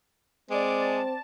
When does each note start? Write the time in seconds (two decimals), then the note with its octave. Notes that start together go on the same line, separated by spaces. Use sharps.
0.50 G#3 C4 D5 D6
0.80 A5